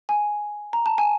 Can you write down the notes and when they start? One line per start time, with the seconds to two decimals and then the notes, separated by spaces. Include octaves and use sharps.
0.09 G#5
0.73 A#5
0.86 A5
0.98 G#5